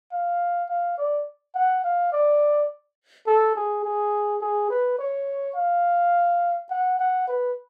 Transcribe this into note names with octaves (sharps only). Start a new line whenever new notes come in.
F5
F5
D5
F#5
F5
D5
A4
G#4
G#4
G#4
B4
C#5
F5
F#5
F#5
B4